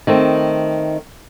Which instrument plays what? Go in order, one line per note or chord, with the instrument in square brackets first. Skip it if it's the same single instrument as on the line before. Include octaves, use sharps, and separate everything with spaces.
[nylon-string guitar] D#3 A3 C4